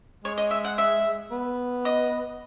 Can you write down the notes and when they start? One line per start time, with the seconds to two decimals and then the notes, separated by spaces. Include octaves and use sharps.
0.24 G#3 C#5
0.38 D#5
0.51 E5
0.65 F#5
0.78 E5
1.31 B3
1.85 D#5